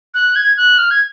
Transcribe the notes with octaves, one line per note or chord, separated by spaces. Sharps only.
F#6
G#6
F#6
F6
G#6